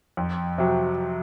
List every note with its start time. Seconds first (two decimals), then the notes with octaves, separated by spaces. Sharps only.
0.17 F2
0.58 C3 F#3